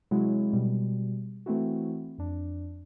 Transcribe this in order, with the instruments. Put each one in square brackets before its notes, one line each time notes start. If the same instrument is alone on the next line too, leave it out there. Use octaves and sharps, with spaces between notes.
[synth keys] C3 F#3 G#3 E4 F#4
B2 G3
E3 A3 C4 E4 F#4
F2 D4